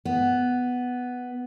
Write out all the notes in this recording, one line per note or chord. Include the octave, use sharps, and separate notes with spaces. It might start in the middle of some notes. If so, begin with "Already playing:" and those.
B3